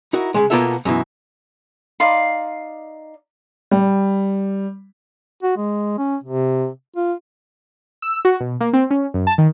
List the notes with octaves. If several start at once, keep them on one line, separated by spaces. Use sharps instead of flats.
D#4 E4 F#4 A#4
C#3 F3 G#3
B2 A#3 B3 F4 A4 E5
F#2 B2 E3
D#4 D5 F5 C6
G3
F#4
G#3
C#4
C3
F4
E6
F#4
B2
A#3
C4
C#4
F#2
A5
D#3